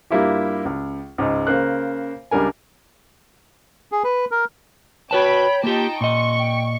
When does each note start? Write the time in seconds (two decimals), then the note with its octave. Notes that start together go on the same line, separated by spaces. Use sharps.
0.10 G2 G3 A#3 E4 F4 G4
0.65 C#2
1.18 C#2 G#2
1.47 C#3 A#3 A#4 C5 F#6
2.31 C#2 G3 D4 A#4 G#5
3.92 G#4
4.04 B4
4.31 A#4
5.11 F#4 B4 C#5 G5 A5 B5
5.64 A#3 D#4 F4 G4 G5 A5
6.01 A#2 D#5 C6 C#6
6.39 G5